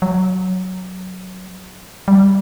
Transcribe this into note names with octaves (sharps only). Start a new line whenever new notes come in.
F#3
G3